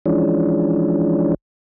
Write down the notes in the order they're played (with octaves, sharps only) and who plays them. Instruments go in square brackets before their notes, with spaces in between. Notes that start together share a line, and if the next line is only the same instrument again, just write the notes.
[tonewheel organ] E3 F3 G#3 C#4 D4